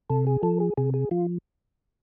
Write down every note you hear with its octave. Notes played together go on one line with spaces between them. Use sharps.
C3 A4
G#4
F3 A4
G#4
C3 G#4
G#4
F3 F4